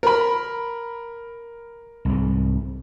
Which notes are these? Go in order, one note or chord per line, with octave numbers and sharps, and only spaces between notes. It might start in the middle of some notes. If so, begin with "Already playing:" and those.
A#4 B5
C2 G#2